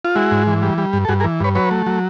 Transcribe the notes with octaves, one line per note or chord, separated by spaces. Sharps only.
F4
G#3 E4 F#4
G#2
E3
G3
G3
G2
A4
G2 F#4 G#4
G#4 A#4
E3
G2 B4 C#5
F#3 B4 C#5
A3
F#3